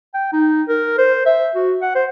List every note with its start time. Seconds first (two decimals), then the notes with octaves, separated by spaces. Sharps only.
0.14 G5
0.33 D#4
0.69 A#4
0.98 C5
1.26 E5
1.55 F#4
1.82 F#5
1.95 C5